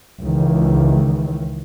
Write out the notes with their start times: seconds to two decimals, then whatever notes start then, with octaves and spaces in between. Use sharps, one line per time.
0.21 C#2 D#3 E3